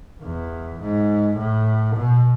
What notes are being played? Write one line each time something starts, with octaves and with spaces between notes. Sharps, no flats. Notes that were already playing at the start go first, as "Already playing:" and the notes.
E2
G#2
A2
B2